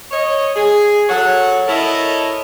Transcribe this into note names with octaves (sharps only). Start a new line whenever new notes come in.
C#5 D#5
G#4
F#3 A4 C#5 F#5
E4 A4 A#4 C#5 D#5 A5